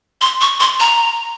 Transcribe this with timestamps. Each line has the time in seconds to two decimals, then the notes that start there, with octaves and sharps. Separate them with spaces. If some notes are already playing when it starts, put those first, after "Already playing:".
0.21 C6
0.41 C#6
0.60 C6
0.80 A#5